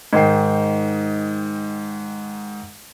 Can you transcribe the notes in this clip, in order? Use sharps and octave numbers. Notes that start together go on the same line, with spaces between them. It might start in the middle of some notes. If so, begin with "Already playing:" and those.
G#2 D#3 G5 C7